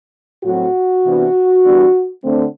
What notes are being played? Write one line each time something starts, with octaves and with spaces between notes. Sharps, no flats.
A2 F#3 C4 F#4
C3 E3 B3 D4
E3 G3 B3 D4
D3 A3 C4